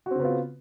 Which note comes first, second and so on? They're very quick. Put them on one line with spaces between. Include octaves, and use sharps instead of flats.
F#4 C4 C#3 B3 F4